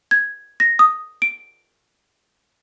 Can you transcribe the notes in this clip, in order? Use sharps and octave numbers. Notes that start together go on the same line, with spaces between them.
G#6
A#6
D#6
D7